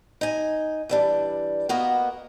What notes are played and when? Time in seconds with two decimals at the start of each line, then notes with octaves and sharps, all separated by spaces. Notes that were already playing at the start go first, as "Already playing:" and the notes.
0.21 D#4 G#5
0.89 E3 G3 D4
1.69 A#3 B3 F#4 D#5